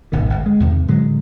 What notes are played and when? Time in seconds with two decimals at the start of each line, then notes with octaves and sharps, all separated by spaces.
0.12 D1 G#1 B2 D#3
0.30 G1
0.46 G#3
0.60 E2 C3 D#3
0.88 A2 D3 F#3 G#3